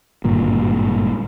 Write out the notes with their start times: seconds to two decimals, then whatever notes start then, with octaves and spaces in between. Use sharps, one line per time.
0.24 G#1 G2 A#2 D3